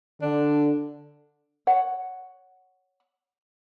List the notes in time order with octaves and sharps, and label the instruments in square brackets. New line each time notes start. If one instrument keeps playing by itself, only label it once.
[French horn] D3 [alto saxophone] D4
[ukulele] C#5 F#5